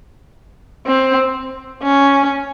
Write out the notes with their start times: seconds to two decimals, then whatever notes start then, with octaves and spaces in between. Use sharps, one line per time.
0.86 C4
1.83 C#4